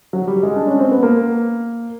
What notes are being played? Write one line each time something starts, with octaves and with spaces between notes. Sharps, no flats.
F#3
G3
G#3
D4
C#4
C4
B3
A#3